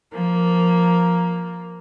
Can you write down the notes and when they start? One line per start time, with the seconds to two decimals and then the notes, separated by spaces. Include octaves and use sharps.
0.11 F3 A#3